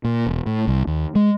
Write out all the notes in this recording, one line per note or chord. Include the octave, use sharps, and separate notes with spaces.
A#2
E1
A2
C2
D#2
G#3